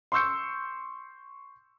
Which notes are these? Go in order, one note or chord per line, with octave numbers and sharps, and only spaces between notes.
C6 C#6 E6 G6 C#7